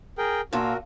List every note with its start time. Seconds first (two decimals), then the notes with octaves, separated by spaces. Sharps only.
0.18 G#4 A#4 G5
0.53 A#2 F4 F#4 A4 A#4